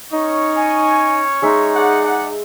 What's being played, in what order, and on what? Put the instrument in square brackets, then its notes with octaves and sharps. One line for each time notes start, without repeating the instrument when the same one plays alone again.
[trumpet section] C#4 C#5 C#6 [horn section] D#4
[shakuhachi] G#5
[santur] G#3 E5 [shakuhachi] D#4
[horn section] G#4 D5 F#5